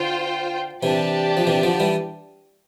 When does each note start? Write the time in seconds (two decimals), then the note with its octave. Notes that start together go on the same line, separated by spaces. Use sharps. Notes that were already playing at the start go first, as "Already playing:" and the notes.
Already playing: D3 F4 C5 G5
0.83 C3 E3 D4 G4 D5 A5
1.37 F3
1.47 C3 E3
1.63 D3 F3
1.80 E3 G3